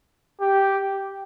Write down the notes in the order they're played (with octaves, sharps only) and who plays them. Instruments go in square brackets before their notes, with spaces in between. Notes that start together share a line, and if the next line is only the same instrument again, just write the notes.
[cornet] G4